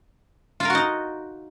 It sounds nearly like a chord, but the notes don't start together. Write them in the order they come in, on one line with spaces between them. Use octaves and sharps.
F4 A#4 F#4 D#4